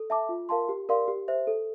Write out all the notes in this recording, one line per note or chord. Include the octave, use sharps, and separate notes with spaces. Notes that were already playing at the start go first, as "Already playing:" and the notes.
Already playing: A4
E5 A5 D6
F4
A#4 F5 A5 C6
G4
A#4 D5 F5 C6
G4
C5 E5
A4